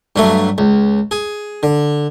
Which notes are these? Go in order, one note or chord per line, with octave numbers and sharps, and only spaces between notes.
G2 F#3 A3
C#2
G#4
D3